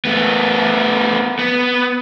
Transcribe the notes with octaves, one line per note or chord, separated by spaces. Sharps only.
A3 B3
B3